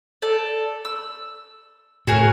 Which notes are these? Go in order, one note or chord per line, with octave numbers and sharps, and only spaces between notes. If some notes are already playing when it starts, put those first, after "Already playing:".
A4 D5
E6
A2 F#4 G#4 A#4